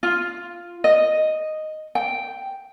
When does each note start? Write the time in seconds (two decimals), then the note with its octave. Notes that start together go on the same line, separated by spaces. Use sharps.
0.03 F4
0.84 D#5
1.95 G5